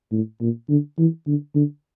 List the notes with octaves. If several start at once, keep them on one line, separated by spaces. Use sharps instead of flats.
A2
A#2
D3
E3
D3
D3